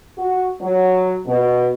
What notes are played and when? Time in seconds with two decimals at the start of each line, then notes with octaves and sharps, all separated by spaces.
0.17 F#4
0.60 F#3
1.26 B2